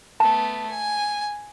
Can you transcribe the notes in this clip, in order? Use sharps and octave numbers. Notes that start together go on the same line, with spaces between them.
A3 B3 A5
G#5